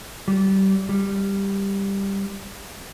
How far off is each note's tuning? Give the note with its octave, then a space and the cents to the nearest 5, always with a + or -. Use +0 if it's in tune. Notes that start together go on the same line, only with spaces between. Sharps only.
G3 -25
G3 +10